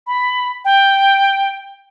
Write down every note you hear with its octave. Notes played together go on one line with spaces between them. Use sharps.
B5
G5